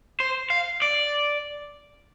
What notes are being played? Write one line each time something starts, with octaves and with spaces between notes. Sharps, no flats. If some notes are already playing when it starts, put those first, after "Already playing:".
C5
F5
D5